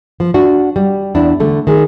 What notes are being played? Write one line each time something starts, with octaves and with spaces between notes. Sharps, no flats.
F3
D4 F#4
G3
E2 D4 E4
D3 A3
D#3 G#4